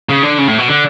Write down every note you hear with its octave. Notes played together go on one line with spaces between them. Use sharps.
C#3
D3
C#3
A2
B2
D3